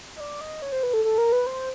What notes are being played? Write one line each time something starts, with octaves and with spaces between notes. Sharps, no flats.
D#5
D5
D#5
C#5
C5
B4
A4
A4
A#4
B4
C5